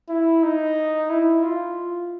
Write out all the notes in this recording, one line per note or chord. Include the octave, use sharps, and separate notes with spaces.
E4
D#4
E4
F4